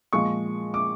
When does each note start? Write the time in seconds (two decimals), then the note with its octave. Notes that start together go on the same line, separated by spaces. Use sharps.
0.13 A#2 F3 G#3 C#6
0.74 D6